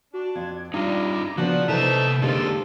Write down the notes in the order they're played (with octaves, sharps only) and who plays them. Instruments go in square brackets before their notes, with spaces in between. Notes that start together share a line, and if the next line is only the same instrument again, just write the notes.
[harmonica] D4 [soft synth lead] F#4
[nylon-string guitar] F2 [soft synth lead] G#6
[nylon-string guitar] G2 [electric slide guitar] D#4 F4 [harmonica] A#5 [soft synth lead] D6
[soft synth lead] C#3 [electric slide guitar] F3 [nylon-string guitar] B3 D4 F#4 [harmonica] F#5
[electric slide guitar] C3 B4 [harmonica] D#4 E5 A5 [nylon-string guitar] E4 A4 [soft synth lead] C5
[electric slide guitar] D3 G#3 A#3 [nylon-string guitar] C4 D#4 [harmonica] F4 A4 [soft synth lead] G4